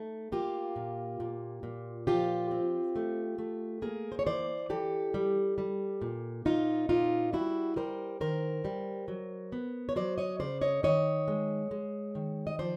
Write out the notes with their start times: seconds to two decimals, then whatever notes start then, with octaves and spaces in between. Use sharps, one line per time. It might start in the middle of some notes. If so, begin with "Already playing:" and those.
Already playing: A3 D#4
0.32 A#3 F4 G4
0.76 A#2
1.20 A#2
1.63 A#2
2.07 F3 F4 G4
2.51 C4
2.96 A3
3.38 A3
3.82 A#3 G#4 A#4
4.12 C5
4.19 C#5
4.26 E3 C5 D5
4.70 E3 G4 A4
5.14 G3
5.58 G3
6.02 A#2
6.45 A#2 D#4 F4
6.89 A#2 D#4 F4
7.33 G3 E4 F#4
7.76 G3 A#4 C5
8.21 D#3 A#4 C5
8.65 G3
9.08 F#3
9.52 B3
9.89 C#5
9.96 F#3 C5 D5
10.18 C#5 D#5
10.40 C#3 C5 D5
10.61 C#5 D#5
10.83 D#3 C#5 D#5
11.28 G#3
11.71 G#3
12.15 D#3
12.47 D#5
12.59 F3 C5 D5